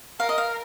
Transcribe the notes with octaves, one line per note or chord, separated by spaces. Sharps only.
A#4 F5
D#5
F5